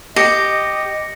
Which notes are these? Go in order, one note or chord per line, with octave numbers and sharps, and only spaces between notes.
G4 D#5 A#6 C#7